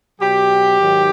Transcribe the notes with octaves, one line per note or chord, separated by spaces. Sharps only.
B2 F#3 G4
G#2 D#3 F#3